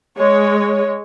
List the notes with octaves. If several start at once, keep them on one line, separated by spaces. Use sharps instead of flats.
G#3 C#5